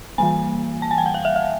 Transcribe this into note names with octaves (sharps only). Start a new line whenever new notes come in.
E3 G3 A#3 G#5
A5
G#5
G5
F#5
F5
E5
E5